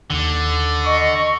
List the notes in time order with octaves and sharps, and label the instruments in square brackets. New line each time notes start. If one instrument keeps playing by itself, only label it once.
[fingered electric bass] D#2 D#3 [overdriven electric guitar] D3
[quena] D#5 [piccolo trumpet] C#6